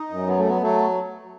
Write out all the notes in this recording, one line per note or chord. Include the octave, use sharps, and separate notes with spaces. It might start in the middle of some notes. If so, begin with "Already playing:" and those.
Already playing: D#4
F#2
F#3 B3
A3
F#3 B3
F#3 A3